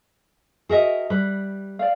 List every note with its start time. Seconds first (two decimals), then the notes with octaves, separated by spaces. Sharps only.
0.69 F#4 G#4 A#4 D#5 E5
1.10 G3 B4
1.79 D5 F5